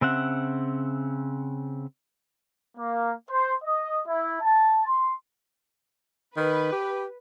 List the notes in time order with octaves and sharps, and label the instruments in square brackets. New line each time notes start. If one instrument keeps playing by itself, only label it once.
[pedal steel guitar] C#3 C4 E5 F#5
[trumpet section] A#3
C5
D#5
E4
A5
C6
[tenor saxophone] D#3 [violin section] B4
[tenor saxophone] G4